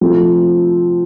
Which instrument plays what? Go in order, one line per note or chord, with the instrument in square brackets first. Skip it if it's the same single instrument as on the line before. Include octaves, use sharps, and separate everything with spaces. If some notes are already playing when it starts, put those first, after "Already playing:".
[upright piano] F3 A3 C4 F4